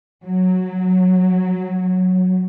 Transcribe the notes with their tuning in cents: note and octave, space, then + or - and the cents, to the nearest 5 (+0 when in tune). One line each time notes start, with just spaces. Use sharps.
F#3 +0